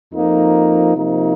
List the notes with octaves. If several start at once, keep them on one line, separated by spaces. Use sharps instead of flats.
F2 F3 A#3 D#4
C3 F3 A#3 D#4